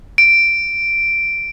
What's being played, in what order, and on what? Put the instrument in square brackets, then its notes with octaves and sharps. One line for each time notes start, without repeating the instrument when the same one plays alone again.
[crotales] D7